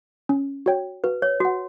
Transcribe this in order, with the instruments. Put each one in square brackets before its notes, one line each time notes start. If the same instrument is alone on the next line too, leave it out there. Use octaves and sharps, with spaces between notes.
[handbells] C#4
F#4 C#5 G5
[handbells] F#4 [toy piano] B4
[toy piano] C#5
[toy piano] F#4 [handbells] C#5 F#5